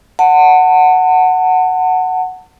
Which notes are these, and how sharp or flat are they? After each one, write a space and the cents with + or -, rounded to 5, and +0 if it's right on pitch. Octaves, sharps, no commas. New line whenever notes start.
F#5 +0 A5 +35